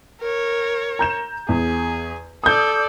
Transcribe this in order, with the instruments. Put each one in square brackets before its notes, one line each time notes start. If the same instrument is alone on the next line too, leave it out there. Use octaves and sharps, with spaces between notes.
[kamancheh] A#4 C#5
[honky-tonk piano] A#5 G6 E7
[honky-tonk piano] E2 [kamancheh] G#4
[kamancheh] A4 D5 [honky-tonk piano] D#6 G6